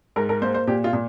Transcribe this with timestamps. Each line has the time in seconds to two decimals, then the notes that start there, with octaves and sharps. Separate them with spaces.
0.16 G#2 A#4
0.29 A#4
0.41 A#3 C5
0.54 C5
0.67 A#2 G4
0.84 F4
0.93 A#2